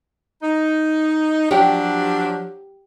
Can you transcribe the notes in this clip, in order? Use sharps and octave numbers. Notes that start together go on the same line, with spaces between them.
D#4
F3 F#3 D4 G4